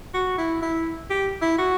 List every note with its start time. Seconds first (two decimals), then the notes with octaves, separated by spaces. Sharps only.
0.14 F#4
0.38 E4
0.62 E4
1.10 G4
1.42 E4
1.58 F#4